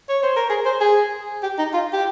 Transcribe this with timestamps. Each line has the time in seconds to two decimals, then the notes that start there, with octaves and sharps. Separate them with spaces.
0.09 C#5
0.23 C5
0.36 A#4
0.49 G#4
0.66 C5
0.81 G#4
1.43 G4
1.59 D#4
1.74 F4
1.93 G4